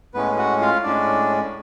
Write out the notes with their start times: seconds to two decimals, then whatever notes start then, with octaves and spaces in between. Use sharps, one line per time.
0.14 A2 G#3 B3 C#4 B4
0.37 F#4 F#5
0.61 F4 F5
0.84 A2 G#3 C#4 D4 D5